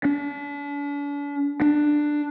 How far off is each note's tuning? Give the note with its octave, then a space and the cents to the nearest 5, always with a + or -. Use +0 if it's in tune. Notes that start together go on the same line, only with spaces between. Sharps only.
D4 -40
D4 +10